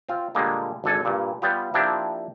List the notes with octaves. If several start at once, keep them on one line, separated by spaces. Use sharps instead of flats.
C4 F4
A#2 D3 G3 G#3 A#3
G#1 D3 A4 G#5
G2 A#2
G3 B3 F4 G4
F3 A#3 C4 D4 E4 G4